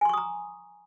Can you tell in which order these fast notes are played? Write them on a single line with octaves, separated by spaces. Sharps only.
G#5 C6 C#6 D#6 A#5